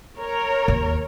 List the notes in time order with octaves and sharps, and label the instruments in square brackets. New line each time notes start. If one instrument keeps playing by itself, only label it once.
[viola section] A#4 C#5
[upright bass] D#2